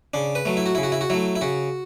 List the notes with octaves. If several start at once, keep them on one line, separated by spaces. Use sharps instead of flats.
C#3 D4
B4
F#3 A3
E4
F#4
C#3 E4
F#4
E4
F#4
F#3 A3 E4
E4
C#3 F#4